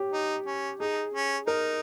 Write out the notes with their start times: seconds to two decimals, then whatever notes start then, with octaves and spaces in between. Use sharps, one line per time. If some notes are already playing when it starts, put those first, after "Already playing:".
Already playing: G4 C#5
0.12 D#4
0.46 C#4
0.79 D#4 G#4
1.14 C#4
1.47 D#4 A#4